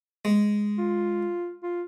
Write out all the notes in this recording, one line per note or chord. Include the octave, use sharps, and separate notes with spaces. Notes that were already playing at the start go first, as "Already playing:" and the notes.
G#3
F4
F4